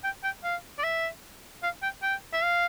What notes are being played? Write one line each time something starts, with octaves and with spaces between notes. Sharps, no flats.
G5
G5
F5
D5
E5
F5
G5
G5
E5
F5